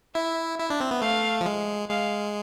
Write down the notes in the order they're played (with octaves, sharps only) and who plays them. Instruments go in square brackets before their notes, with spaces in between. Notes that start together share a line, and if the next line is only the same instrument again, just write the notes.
[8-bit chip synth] E4 [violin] E5
[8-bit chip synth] E4 [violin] E5
[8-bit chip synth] D4
C4
B3
[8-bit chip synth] A3 [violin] F5
[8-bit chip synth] F3
G#3
[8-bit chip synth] G#3 [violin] F5